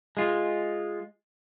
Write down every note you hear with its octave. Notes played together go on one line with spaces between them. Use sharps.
G#3 F4